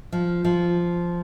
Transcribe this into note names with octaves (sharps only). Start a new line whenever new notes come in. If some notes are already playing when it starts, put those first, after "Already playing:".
F3
F3